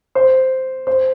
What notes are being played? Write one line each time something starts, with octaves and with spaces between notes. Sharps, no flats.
C5
C5